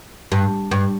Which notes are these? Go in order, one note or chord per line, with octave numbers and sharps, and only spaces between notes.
G2
G2